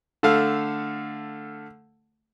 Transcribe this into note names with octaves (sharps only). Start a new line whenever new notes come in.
D3 A3 F5